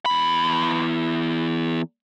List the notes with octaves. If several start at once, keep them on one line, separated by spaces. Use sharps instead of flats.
E2 B5